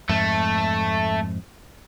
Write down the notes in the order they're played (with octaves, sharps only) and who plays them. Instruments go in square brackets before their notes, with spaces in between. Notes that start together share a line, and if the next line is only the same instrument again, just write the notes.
[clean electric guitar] F2 G#2 [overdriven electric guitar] A3